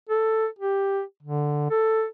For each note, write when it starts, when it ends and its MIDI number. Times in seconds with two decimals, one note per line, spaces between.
0.09 0.47 69
0.59 1.02 67
1.23 1.67 50
1.70 2.05 69